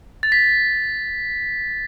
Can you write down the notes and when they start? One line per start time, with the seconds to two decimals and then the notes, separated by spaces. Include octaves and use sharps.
0.23 A6
0.32 B6